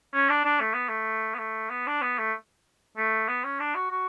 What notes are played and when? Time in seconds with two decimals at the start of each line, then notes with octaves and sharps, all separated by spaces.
0.14 C#4
0.29 D4
0.45 D4
0.60 A3
0.74 B3
0.89 A3
1.34 B3
1.39 A3
1.70 B3
1.87 D4
2.02 B3
2.19 A3
2.97 A3
3.28 B3
3.44 C#4
3.60 D4
3.75 F#4
3.91 F#4